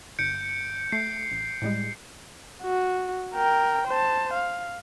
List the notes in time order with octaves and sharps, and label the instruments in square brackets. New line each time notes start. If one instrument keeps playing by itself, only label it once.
[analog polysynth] G1 [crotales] G6 C#7 D7
[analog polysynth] A3 [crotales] C7
[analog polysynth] A1
A2 G3 G#3
[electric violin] F#4
A#4 G5
C5 A5
F5